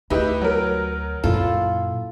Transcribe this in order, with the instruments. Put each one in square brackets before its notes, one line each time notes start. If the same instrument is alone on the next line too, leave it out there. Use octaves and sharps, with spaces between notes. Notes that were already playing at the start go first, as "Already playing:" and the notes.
[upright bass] D2 [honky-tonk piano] D#4 E4 G4 [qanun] B4
[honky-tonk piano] F#3 A#4
[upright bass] F#2 A#2 [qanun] E4 F4 A4